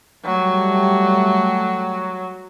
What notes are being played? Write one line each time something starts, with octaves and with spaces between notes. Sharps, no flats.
F#3 G3 A3